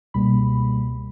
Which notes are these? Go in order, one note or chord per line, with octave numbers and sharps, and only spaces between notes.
C#2 B2 G3 A#3 B5